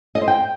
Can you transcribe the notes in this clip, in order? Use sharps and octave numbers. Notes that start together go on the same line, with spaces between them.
D#5
C5
G5